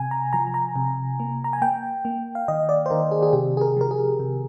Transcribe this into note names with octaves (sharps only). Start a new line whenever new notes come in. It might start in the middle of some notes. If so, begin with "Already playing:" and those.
Already playing: C3 G#5
A#5
F3 A#5
A#5
C3
A#3
A#5
G#5
A#3 G5
A#3
F5
D#3 D#5
D5
C5
D#3 A#4
G#4
G#4
C3 G4
G#4
A#4
F3 A#4
G#4
C3